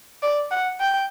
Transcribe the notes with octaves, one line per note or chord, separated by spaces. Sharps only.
D5
F#5
G5